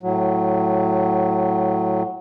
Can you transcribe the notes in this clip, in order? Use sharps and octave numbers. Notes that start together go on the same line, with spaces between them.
A2 F#3